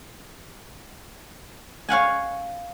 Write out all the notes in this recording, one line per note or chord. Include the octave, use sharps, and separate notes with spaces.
C#5 F5 F#5 G#5